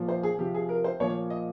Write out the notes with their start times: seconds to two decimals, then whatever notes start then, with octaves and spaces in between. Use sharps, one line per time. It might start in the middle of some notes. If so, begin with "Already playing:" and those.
Already playing: A#2 F3
0.08 C5
0.23 G#4
0.39 C3 F3 G4
0.54 G#4
0.69 A#4
0.84 C5
1.00 A#2 F3 C#5
1.30 D#5